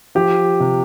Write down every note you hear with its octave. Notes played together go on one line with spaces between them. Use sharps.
F3 G4
C3